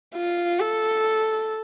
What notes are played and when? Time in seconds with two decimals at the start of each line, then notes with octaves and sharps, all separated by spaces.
0.15 F4
0.60 A4